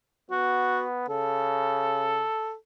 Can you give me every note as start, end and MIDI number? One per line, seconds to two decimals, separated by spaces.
0.31 1.07 59
0.31 0.84 66
1.09 2.26 49
1.09 2.55 69